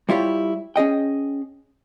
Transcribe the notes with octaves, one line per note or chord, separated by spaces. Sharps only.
G3 E4 F4 G4 C#5
C#4 G#4 D#5 G5